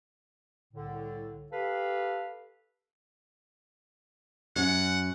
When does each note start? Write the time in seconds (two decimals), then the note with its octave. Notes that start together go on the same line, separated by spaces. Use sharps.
0.74 C2 A2 D3
1.52 G4 A4 B4 F5
4.56 F#2 F#5